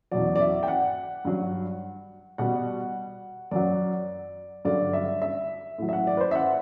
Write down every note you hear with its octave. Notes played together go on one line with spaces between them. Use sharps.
E2 B2 F#3 D5
D5
E5
G5
F#5
G2 F#3
B2 G3 F#5
F#2 F#3 D5
G2 D3 F#3 D5
E5
E5
A2 F#3
E5
F#5
D5
B4
C5
E5
F#5